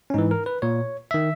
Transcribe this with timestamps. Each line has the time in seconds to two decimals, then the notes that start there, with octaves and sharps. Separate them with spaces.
0.10 C#4
0.14 G#2 E3 D#4
0.31 A#4
0.46 B4
0.62 A#2 C#5
1.11 D#3 E5